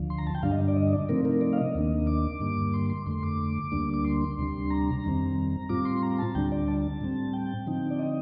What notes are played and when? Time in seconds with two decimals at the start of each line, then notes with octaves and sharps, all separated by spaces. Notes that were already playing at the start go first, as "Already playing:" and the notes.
Already playing: D2 D3 F3
0.10 C6
0.18 A#5
0.27 A5
0.35 G5
0.43 G2 D3 G3 D4 F5
0.52 D#5
0.68 D5
0.76 D#5
0.92 D5
1.09 C3 F3 A3 C4 D#4 A#4
1.25 A#4
1.41 D5
1.53 F5
1.57 D#5
1.75 D#2 D#3 A#3 D4
2.07 D6
2.40 G2 D3 G3 A#3
2.74 C6
2.90 C6
3.06 F2 D3 A3 C6
3.23 D6
3.72 D2 D3 G3 A#3 D4
3.94 D6
4.04 C6
4.38 D2 C3 G3 D4
4.70 A#5
5.04 F2 D#3 G3 C4
5.69 A2 G3 C4 F4 D6
5.85 C6
6.03 A#5
6.19 A5
6.35 D2 D3 G3 D4 G5
6.52 D5
6.68 A5
7.01 A2 G3 C4
7.33 G5
7.67 D3 F3 C4 D#4
7.90 D5
7.99 D#5